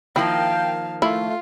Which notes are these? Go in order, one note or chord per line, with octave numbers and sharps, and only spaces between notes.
D#3 F3 A#3 E4 F5 G5 A5
A3 E4 F4